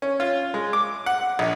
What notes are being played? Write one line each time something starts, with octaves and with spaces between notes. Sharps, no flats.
C#4
F4
G#3
D6
F#5
A#1